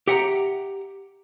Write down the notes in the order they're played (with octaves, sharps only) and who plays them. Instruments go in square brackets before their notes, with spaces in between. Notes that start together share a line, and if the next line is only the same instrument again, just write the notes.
[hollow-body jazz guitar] G4 E5 F#5 G5 A#5